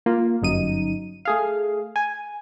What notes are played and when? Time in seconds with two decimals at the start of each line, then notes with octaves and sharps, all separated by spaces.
0.06 A#3 F4
0.42 G1 F#2 D#4 D#7
1.25 A3 G#4 F5
1.96 G#5